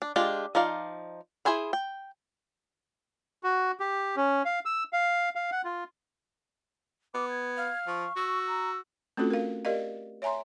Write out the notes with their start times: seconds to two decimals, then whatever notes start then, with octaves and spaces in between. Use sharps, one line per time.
0.02 D4
0.16 G#3 D4 F4 G4
0.55 F3 D#4 D5 F5
1.45 E4 G#4 C5 G#5 B5
1.73 G5
3.43 F#4
3.80 G4
4.16 C#4
4.45 F5
4.65 E6
4.93 F5
5.35 F5
5.52 F#5
5.65 F4
7.14 B3 D6
7.30 G#6
7.57 F5
7.87 F3 C#6
8.16 F#4 E6
8.48 A#5
9.17 A3 C4 C#4 F4 F#4 A4
9.30 A#4 F5
9.65 G4 A#4 D5 D#5 F5
10.22 C#5 E5 G#5 A#5 C6